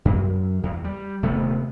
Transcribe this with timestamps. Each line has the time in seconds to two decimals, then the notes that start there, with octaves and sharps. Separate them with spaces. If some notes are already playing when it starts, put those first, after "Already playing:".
0.05 F#2
0.63 E2
0.84 G3
1.23 D#1 C3 A3 B3